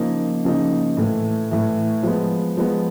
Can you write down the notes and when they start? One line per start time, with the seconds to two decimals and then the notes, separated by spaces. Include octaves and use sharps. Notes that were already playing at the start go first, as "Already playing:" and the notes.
Already playing: C#3 F3 A#3 D#4
0.44 C#3 F3 A#3 D#4
0.97 A2 E3 A3
1.51 A2 E3 A3
2.03 F3 G#3 B3
2.57 F3 G#3 B3